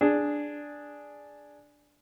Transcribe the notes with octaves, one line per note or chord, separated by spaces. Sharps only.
D4 G#4